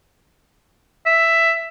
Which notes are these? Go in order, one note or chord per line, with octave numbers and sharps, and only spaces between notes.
E5